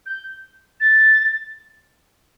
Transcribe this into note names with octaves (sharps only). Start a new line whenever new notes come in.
G6
A6